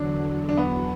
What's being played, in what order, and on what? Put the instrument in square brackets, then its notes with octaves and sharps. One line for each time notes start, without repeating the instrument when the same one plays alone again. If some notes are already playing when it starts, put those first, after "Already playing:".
Already playing: [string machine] E2 D3 F#3 [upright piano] D4
[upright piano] D4
B3